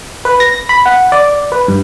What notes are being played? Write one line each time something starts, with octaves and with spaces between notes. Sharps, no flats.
B4
A#6
B5
F#5
D5
B4
G2